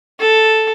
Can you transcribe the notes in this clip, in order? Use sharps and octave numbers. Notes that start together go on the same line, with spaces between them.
A4